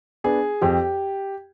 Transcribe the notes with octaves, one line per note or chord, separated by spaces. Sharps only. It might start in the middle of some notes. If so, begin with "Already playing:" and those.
B3 D4 G#4
F2 G4